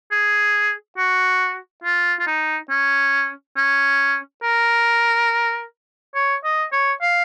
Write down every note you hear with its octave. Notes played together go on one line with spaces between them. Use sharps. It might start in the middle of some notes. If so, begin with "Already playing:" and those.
G#4
F#4
F4
F4
D#4
C#4
C#4
A#4
C#5
D#5
C#5
F5